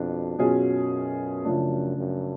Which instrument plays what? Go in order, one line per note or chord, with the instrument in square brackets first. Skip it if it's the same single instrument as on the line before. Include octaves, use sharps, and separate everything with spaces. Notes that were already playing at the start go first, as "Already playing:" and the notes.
Already playing: [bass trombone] F2 [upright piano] B2 D4
[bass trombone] F#2 [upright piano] B2 F#3 C#4 F4 G#4
[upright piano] C#3 F3 A3 D4
[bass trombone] F#2